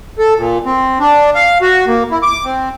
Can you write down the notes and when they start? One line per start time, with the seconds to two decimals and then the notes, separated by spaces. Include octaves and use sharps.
0.19 A4
0.37 A#2
0.65 C4
1.00 D4
1.35 F5
1.61 F#4
1.87 A#3
2.11 E4
2.23 D6
2.45 C4